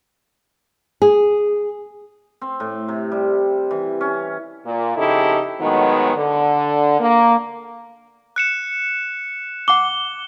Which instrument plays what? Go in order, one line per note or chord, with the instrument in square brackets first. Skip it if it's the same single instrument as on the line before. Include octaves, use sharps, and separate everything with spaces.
[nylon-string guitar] G#4
[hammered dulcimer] C4
A2
C3
G3
E3
C#4
[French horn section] A#2
F2 C#3 D#4 E4 G4 A4
A2 D#3 F#3 G#3 B3
D3
A#3
[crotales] F#6 C#7 E7
[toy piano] F#5 D6 [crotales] G7